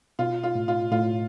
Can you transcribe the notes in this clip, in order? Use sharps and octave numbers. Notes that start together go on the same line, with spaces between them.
B2 F4
F4
A2
F4
A2 F4